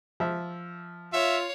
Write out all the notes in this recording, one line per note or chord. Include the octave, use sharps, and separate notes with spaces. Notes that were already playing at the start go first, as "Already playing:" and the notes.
F3 E5
F4 C#5 E5 F5